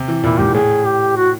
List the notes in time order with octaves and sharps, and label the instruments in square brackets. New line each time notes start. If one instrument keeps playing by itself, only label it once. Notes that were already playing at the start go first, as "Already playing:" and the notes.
Already playing: [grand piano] C3
E3
[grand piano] A#2 [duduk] E4
[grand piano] G#2 [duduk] G4
[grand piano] A2 [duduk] G#4
[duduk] G4
F#4